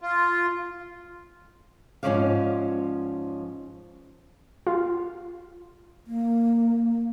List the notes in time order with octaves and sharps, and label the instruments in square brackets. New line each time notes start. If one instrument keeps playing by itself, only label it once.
[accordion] F4
[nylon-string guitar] G#2 F3 F#3 C#4 D5 F5
[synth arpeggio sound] F4
[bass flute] A#3